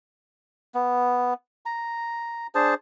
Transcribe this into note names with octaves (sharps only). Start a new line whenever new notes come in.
B3
A#5
D4 G#4 C5 A5